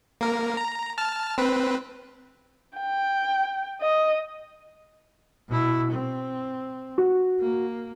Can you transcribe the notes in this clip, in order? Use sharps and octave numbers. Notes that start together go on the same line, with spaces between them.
A#3 A#4
A#5
A5 F6
C4 B4
G5
D#5
B2 E4
C4
F#4
A#3